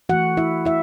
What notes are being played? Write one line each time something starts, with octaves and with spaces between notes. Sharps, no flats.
E3 A3 F#4 F#5
E4 E5
E4 E5